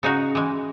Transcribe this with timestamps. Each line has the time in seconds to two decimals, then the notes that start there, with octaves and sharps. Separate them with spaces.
0.03 C#3 D#4 F#4
0.35 E3 G#3